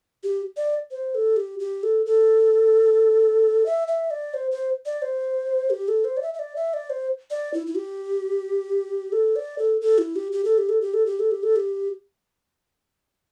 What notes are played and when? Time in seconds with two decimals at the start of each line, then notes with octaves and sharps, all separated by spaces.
0.23 G4
0.57 D5
0.91 C5
1.15 A4
1.36 G4
1.60 G4
1.83 A4
2.06 A4
3.66 E5
3.88 E5
4.11 D5
4.34 C5
4.51 C5
4.86 D5
5.02 C5
5.70 G4
5.88 A4
6.05 C5
6.17 D5
6.23 E5
6.34 E5
6.39 D5
6.56 E5
6.74 D5
6.90 C5
7.30 D5
7.54 E4
7.67 E4
7.76 G4
9.12 A4
9.36 D5
9.59 A4
9.81 A4
9.98 E4
10.16 G4
10.32 G4
10.45 A4
10.58 G4
10.69 A4
10.81 G4
10.94 A4
11.06 G4
11.20 A4
11.31 G4
11.43 A4
11.56 G4